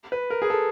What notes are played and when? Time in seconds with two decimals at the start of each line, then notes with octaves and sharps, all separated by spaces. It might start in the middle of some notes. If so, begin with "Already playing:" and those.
0.12 B4
0.30 A#4
0.42 G#4
0.50 A4